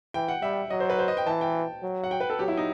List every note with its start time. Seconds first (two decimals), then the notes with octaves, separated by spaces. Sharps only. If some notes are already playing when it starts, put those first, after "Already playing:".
0.14 E3 G5
0.28 F#5
0.42 G3 E5
0.70 F#3 D#5
0.80 C5
0.90 B4
0.99 C5
1.08 D#5
1.17 G5
1.26 E3 A5
1.41 G5
1.82 F#3
2.04 F#5
2.11 G5
2.20 B4
2.30 A4
2.39 F#3 G4
2.48 E4
2.57 D#4